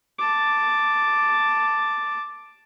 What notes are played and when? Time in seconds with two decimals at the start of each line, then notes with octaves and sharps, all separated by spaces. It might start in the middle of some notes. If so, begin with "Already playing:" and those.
0.18 A5 D6